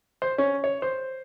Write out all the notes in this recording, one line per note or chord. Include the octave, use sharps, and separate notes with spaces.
C5
C#4
C#5
C5